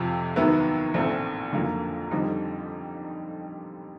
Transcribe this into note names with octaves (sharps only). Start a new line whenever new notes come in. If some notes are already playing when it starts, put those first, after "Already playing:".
Already playing: F2 C3 F3
D#2 D#3 F#3 B3 E4
A#1 A2 E3 A3 C4
F2 D3 F#3 A#3
F2 D3 G3 C4 D#4